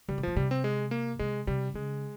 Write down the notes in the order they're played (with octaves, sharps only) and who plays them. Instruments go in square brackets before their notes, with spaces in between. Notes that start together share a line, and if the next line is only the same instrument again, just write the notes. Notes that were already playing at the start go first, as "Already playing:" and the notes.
[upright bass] C#3 [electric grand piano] G3
[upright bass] C3
[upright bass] A#2 [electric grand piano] F3
[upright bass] C3 [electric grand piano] G3
[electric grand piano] C4
G#3
A#3
[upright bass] C3 [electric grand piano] G#3
[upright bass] C3 [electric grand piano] G3
[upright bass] C#3 [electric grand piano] G#3